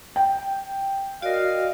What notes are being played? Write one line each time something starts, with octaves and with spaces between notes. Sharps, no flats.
G5
F#4 A#4 D5 D#5 F5